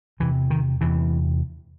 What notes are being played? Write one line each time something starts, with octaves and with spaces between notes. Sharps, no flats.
E2 C3 E3
D#3
E2 C3 E3